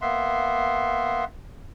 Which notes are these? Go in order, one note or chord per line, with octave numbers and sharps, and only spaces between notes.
A#3 B3 E5 C6